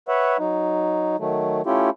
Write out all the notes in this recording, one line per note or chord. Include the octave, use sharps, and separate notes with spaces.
B4 C#5 E5 F#5
F#3 D#4
D#3 F#3 A3
A3 C#4 E4 F4 G4